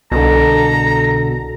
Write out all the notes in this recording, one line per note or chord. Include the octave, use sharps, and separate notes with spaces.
C2 B2 D3 A4 A#5